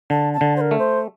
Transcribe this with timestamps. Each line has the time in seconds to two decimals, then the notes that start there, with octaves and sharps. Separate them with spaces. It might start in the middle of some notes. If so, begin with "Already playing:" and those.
0.10 D3 A5
0.34 A5
0.41 D3
0.56 C5
0.61 A#4
0.71 A3
0.79 C5